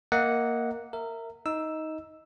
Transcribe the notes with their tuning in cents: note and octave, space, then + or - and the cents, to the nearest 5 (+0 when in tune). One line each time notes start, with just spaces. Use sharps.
A#3 +0 D#5 +30 F#5 +0
A#4 -20 E5 -5
D#4 +15 E6 +0